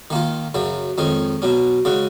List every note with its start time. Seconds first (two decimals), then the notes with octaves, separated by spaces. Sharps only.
0.10 D#3 A#3 F4
0.54 F#2 C#3 F#3
0.98 F2 D#3 G#3 C#4
1.42 B2 F#3 C#4
1.85 C#3 G#3 C#4 F#4